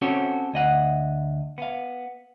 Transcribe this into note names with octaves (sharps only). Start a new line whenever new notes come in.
C4 C#4 F#4 G4 A4 C#5
D2 D#5 F#5
B3 F5